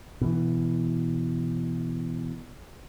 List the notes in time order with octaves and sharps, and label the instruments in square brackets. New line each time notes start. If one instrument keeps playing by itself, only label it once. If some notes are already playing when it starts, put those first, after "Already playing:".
[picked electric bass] B2 E3